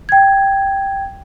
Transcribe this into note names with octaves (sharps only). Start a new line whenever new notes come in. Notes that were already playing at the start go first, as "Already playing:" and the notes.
G5 G#6